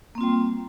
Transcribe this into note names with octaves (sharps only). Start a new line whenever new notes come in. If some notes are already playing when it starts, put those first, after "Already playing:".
G3 A#3 C4 F4